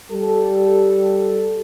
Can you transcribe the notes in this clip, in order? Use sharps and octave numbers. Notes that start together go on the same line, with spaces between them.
G3 A4